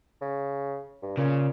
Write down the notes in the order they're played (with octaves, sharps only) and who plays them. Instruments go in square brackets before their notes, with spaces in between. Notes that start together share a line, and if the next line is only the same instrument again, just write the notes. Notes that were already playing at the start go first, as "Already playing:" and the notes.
[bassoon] C#3
G2
[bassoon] A#2 [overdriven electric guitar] C#3